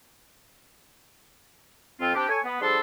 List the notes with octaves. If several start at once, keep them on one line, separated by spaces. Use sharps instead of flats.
F2 C4 F4
C4 D4 G4
A4 C#5 G#5
B3
F3 G3 D4 G#4 A4 C6